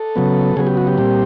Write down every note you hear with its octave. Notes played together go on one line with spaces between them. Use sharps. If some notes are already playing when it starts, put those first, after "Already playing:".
Already playing: A4
C#3 F#3 B3
C#3 F#3 B3 G#4
G4
F#4
G4
A#2 G3 C4